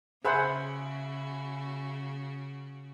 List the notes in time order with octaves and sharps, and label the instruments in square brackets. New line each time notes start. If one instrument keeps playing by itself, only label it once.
[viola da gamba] C#3 F#4 [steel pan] G#4 C5 F#5 [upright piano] E5 G#5 B5